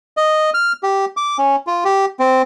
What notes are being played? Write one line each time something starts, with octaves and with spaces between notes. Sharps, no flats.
D#5
F6
G4
D6
C#4
F4
G4
C4